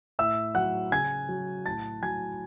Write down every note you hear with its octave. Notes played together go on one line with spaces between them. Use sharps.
A2 E5 E6
F#3 F#5 F#6
C#3 G#5 G#6
F#3
A2 A5 A6
F#3 G#5 G#6